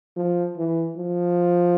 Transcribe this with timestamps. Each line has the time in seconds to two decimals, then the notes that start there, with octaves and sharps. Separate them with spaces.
0.17 F3
0.57 E3
0.97 F3